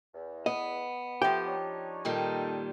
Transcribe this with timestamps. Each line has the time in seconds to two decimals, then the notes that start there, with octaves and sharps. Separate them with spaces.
0.14 E2
0.46 B3 D#5
1.22 F3 A3 G4 G5
1.46 D4 D#4 C#5
2.05 A#2 D#3 G3 D#4 A4